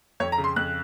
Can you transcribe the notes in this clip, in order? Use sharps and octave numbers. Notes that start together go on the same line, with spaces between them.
F2 C#5
A#5
C#3
C6
F2 F#6